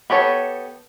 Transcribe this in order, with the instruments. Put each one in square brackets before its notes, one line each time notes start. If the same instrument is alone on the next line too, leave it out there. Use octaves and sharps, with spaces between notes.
[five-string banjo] B3 G4 A4 C#5